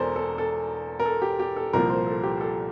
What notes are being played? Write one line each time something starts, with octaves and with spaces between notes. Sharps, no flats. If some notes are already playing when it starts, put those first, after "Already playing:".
Already playing: E1 E2 E3 A4 A#4 C5 D5
A4
A4
A#4
A4
G4
G4
A4
C2 A#2 F3 A#4
C5
A4
G4
A4